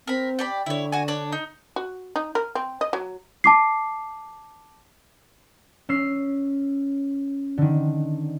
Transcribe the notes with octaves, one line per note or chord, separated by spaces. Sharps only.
C4 A#4 B5
G4 D5 B5
D3 E4 C#5
F#4 G#5
D4 C#5 F#6
D#4
F#4
D#4
A#4
C4
D#5
F#3
A5 D6 C7
C#4 E6 C7
D3 D#3